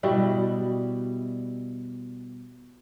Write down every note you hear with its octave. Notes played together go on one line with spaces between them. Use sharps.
B2 G3 E4